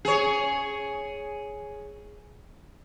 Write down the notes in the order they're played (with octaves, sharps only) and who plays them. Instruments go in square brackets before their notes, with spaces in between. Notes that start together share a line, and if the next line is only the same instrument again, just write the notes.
[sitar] G#4 C#5